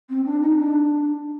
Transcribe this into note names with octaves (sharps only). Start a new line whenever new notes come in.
C4
D4
D#4
D4